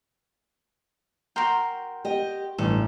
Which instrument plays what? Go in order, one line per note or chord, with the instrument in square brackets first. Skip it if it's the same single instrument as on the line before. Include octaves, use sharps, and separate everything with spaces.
[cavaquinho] F#4 A#4 [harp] G5 C6
[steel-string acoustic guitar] G4 D#5
[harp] A1 [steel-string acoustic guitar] G2 [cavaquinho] A4